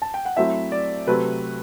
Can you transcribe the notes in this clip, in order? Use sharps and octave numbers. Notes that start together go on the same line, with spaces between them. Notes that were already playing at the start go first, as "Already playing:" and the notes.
A5
G5
F#5
F#3 A3 C4 E4 E5
D5
C3 F#3 A3 C4 B4